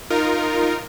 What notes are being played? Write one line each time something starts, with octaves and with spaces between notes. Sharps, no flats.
D#4 F4 A#4